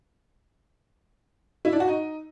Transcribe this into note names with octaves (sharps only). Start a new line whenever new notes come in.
E4
D4
F#4
D#4